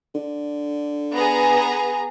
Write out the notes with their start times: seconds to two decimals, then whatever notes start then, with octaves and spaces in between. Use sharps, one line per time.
0.15 D3
1.15 B3 G#4 A#5